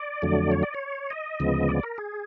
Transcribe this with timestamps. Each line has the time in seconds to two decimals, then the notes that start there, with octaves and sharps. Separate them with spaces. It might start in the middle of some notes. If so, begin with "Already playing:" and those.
Already playing: D5
0.22 F2 D3 F#3 A3
0.52 C#5
0.63 D5
0.74 C#5
1.10 D#5
1.40 D2 C#3 F3 G#3 B3
1.69 D5
1.83 A#4
1.98 G#4